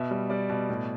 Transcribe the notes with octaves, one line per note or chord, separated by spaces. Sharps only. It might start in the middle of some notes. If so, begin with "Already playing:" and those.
Already playing: B2 E5
G3
G3 D5
B2
A2